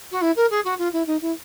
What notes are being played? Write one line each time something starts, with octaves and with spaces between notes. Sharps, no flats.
F#4
E4
A#4
G#4
F#4
F4
E4
D#4
E4